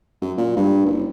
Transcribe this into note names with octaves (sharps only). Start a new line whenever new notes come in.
F#2
A#2
G2
F#1